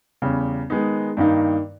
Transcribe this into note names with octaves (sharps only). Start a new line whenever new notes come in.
E2 C#3 G3
D#3 G#3 B3 D#4
G2 D#3 A#3 D#4